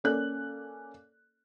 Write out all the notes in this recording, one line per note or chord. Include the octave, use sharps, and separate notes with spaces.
A#3 C#4 A4 D5 F#6